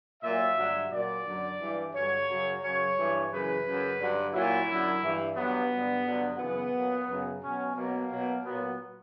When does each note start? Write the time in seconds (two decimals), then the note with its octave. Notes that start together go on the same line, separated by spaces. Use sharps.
0.22 A#2 F#3 E5
0.56 G2 D3 F#3
0.91 A#2 F#3 D5
1.25 F#2 D3 F#3
1.59 G2 E3
1.94 G2 D3 F#3 C#5
2.28 F#2 C#3 F#3
2.62 F#2 C#3 F#3 C#5
2.96 G2 E3
3.31 F#2 C#3 E3 B4
3.65 F#2 C#3 F#3
3.99 G2 D3 F#3
4.33 A#2 F#3 E4
4.68 F#2 D3 F#3
5.02 G2 E3
5.36 G2 F#3 B3
5.71 G2 D3 F#3
6.05 G2 D3 F#3
6.39 F#2 C#3 E3 B3
6.73 A#2 F#3
7.08 F#2 C#3 F#3
7.42 B2 F#3 C#4
7.75 B2 F#3 A#3
8.10 B2 F#3
8.44 A#2 F#3 B3